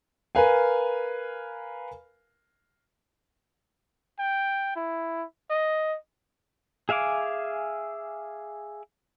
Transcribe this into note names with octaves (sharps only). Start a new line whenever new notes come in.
A#4 B4 F5 G#5
G5
E4
D#5
G#4 E5 F5 G#5 D6